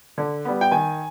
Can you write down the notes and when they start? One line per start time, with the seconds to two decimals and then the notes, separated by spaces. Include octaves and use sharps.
0.18 D3
0.45 G3 B3
0.61 G5
0.72 D#3 G#5